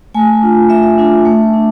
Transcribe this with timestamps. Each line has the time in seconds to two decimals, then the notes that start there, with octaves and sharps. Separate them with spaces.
0.14 A3 G#5
0.42 D4 F4
0.69 A3 E5
0.98 D4 F4
1.25 A3
1.54 D4